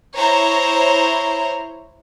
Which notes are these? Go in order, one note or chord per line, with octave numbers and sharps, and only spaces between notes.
E4 C5 C#5 A#5